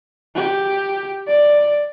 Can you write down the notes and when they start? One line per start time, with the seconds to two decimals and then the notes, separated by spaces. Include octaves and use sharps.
0.35 G4
1.27 D5